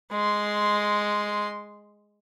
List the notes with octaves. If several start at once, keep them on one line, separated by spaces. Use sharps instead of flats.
G#3 C6